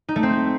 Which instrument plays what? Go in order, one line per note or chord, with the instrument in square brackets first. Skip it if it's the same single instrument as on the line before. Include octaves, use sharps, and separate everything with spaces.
[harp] D#4
A3
C4